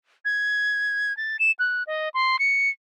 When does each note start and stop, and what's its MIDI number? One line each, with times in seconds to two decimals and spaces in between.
0.25 1.15 92
1.17 1.37 93
1.39 1.52 100
1.59 1.83 90
1.87 2.09 75
2.14 2.37 84
2.39 2.69 97